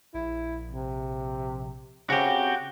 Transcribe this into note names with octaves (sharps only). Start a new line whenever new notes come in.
A#1 E4
C3
C#3 C4 F#4 G4